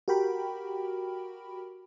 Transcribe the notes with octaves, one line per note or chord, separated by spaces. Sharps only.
F#4 G4 A#4 G5 B5